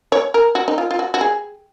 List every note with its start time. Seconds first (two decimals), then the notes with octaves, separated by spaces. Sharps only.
0.12 C#5
0.34 A#4
0.55 F#4
0.68 D#4
0.78 F4
0.91 F4
0.99 F#4
1.14 F#4
1.21 G#4